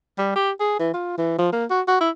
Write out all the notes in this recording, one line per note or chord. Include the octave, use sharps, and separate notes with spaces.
G3
G4
G#4
E3
F4
E3
F3
A#3
F#4
F#4
E4